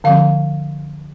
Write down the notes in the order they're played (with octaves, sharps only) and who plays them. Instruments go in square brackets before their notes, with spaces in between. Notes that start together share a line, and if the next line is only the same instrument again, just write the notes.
[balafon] D3 F3 C4 F5